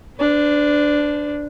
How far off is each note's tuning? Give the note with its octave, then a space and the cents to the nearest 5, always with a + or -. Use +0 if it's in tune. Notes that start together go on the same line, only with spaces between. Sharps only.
D4 +0 C5 -45